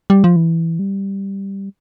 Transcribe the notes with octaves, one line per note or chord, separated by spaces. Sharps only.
G3
F3
E3
G3